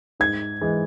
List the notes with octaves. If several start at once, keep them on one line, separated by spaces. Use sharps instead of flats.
G#2 G#6
E3 G#3